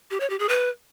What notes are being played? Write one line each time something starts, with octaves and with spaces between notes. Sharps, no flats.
G4
C#5
G4
G#4
B4